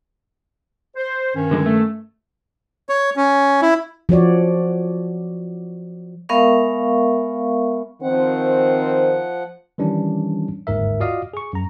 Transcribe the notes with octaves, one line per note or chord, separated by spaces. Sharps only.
C5
G2 D#3 C#4
D3 G#3
A3
C#5
C#4
E4
F3 F#4 C#5 D5
G#3 B3 A#4 E5 F5 C#6
D#3 F3 C4 F#5
D#3 E3 G3 C#4 D4
G1 D#2 G#2 A#4 E5
F4 F#4 D5 D#5 F5 D#6
G#4 C#6
F#2 A#5